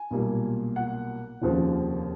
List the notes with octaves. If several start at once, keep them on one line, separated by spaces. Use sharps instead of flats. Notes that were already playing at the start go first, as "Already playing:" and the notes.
Already playing: G#5
B1 A#2 G3 A#3
F#5
F1 D#2 C#3 F3